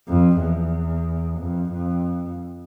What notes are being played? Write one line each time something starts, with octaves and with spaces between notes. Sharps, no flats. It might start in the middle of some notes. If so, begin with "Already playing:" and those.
F2
E2
F2
F2